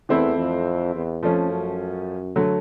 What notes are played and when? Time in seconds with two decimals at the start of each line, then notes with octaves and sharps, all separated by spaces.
0.09 E2 E3 A3 C4 E4
0.38 F2
0.94 E2
1.22 F2 F3 A3 C#4
1.51 F#2
2.36 D3 F#3 A3